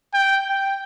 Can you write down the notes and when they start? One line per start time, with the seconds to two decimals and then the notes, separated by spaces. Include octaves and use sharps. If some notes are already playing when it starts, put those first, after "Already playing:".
0.14 G5
0.50 G5